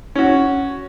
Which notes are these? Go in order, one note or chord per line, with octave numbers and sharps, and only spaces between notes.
C#4 F#4